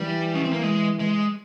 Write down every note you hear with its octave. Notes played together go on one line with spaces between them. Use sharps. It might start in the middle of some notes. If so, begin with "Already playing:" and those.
Already playing: E3 G3
C#4
C4
A#3
G#3
G#3